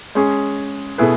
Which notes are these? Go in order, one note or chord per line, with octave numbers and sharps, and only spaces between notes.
G#3 C#4 G#4
B2 A3 E4 G#4 B4